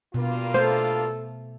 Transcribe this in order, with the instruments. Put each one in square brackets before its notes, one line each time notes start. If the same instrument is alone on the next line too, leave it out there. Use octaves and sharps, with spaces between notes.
[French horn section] G2 A#3 F4 [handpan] B2
[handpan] A3 [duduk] A4 [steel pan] C5